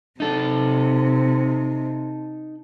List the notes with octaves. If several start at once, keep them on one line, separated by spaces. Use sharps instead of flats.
C3 D#4 A4